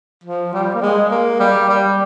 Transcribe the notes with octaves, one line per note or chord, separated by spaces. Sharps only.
F3
G3
A#3
G#3
A#3
G3
G3